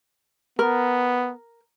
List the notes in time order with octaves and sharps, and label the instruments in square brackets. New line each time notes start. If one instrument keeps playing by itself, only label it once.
[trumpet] B3 [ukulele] A#4